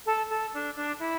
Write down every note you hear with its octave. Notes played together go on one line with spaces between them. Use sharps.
A4
A4
D4
D4
E4